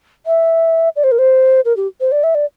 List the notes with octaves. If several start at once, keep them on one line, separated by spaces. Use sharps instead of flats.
E5
D5
C5
A#4
C5
A#4
G4
C5
D5
E5
D5